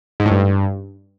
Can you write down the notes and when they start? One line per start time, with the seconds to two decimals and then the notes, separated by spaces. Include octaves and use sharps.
0.20 G#2
0.25 A2
0.31 G2